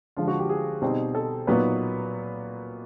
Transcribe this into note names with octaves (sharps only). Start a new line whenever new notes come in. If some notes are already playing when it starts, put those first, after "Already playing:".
D3 F3 G#3 F4
F#4
G4
G#4
B2 G3 C4 D#4
A4
A#2 F#3 B3 D#4 B4